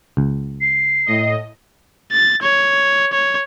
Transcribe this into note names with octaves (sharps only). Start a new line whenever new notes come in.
C#2
C7
A2 D#5
A6
C#5
C#5